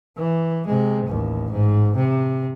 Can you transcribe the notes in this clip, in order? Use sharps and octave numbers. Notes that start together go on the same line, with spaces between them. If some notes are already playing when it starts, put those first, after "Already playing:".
E3
C3 G#3
A1 D#2
G#2
C3